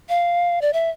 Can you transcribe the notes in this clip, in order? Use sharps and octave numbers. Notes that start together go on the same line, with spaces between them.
F5
D5
E5